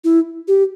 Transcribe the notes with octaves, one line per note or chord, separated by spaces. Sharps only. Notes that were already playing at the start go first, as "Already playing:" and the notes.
E4
G4